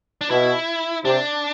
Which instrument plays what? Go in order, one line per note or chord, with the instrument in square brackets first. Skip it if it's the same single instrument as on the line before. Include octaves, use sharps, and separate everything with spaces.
[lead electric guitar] D4
[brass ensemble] B2 [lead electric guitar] E4
[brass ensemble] C3 [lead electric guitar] D4